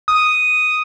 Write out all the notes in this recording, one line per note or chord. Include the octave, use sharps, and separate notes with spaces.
D#6